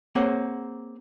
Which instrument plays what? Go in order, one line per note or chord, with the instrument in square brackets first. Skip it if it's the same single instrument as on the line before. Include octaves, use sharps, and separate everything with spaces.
[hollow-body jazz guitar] A#3 C4 G#4 C#5 F#5